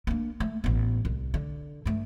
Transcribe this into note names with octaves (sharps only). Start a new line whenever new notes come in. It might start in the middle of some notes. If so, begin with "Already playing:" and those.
A#3 D4
A3
A1 B3
C2
D3
G2 A3